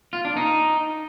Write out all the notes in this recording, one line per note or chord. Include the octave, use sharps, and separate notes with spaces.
F4
D4
D#4